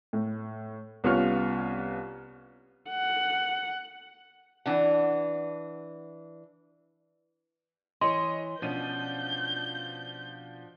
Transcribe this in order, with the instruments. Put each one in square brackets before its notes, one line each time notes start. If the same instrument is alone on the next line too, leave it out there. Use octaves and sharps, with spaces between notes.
[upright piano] A2
C2 B3 C#4 F4 C#6 F6
[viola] F#5
[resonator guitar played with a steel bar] E3 D4 F#5
[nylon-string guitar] E3 C#5 [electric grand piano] D#5 [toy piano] C6
[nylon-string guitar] B2 C#4 [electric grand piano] F3 D4 D#7 [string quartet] G6